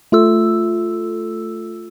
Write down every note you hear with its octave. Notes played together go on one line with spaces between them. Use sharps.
A3 F4 A4 E6